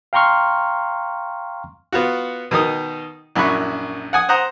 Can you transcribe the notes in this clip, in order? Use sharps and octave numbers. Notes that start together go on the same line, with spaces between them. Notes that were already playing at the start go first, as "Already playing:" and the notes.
F5 G5 A#5 C6 C#6 F6
B3 F4 F#4
B2 D#3 D#4 D#6
A#1 F#2 E4 B5 C#6 F#6
F#5 G#5 D#6
C5 F#5 A#5 D#6